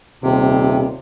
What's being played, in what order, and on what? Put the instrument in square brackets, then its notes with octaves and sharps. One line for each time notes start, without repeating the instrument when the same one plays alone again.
[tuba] D#1 [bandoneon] C3